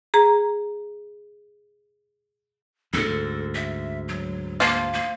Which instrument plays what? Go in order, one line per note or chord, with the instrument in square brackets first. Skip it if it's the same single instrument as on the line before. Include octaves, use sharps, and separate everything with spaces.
[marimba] G#4 A#5
[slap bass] D2 G#2 [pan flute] A4
[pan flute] E5
F#3
[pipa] F3 F4 [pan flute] A#3
[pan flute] A#3